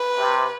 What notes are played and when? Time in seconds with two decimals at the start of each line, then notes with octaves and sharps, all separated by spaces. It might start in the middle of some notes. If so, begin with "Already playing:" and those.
Already playing: B4
0.17 C3